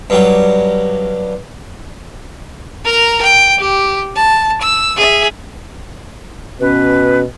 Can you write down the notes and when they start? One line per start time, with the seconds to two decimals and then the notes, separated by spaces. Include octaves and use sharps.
0.10 G2 F#3 G3
2.85 A#4 A#5
3.22 G5
3.58 G4
4.16 A5
4.61 E6
4.97 G#4 E5
6.60 B2 C#4 B4